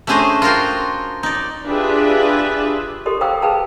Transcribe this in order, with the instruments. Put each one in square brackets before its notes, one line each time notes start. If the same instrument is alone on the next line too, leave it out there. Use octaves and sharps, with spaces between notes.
[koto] A3 C#4 D4 G#4 C5 D#5
F4 F#4 A#4 F5 G5
D#4 D5
[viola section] D4 F4 G4 G#4 B4 E5
[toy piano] G4 A4 A#4 D#5 C6
C5 F5 G5 A#5 D6 E6
G#4 B4 F5 G5 A5 A#5